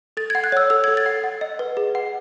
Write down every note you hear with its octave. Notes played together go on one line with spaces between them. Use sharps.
A4 A6
F#5 G#6
F#6
C#5 E6
A4 E6
A4 G#6
A6
F#5
F#5
D#5
B4
G#4
F#5